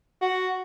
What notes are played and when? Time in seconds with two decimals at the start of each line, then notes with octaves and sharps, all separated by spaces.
0.21 F#4